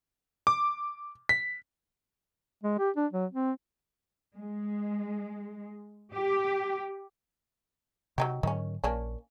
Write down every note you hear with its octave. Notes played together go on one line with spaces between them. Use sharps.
D6
B6
G#3
G4
D4
F#3
C4
G#3
G4
C3 F#3 D#4 G4
G#2 D3 D#3 F#3 C#4
A#1 A#3 C#4 D4